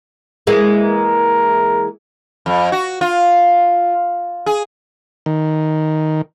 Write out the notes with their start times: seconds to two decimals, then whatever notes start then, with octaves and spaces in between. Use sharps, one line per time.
0.47 E3 G#3 A#3
0.84 A#4
2.46 F2
2.72 F#4
3.01 F4
4.46 G#4
5.26 D#3